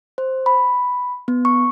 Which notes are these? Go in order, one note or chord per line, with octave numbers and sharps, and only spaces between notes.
C5
B5
B3
C#6